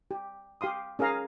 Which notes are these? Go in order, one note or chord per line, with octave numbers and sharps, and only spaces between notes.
G4
G4 F5 C6 D#6
C#4 G#4 A#4 F5 A#5